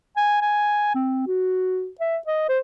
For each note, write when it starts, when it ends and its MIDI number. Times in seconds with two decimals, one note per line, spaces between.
0.17 0.41 80
0.42 0.91 80
0.95 1.23 60
1.27 1.88 66
2.00 2.17 76
2.27 2.48 75
2.49 2.59 72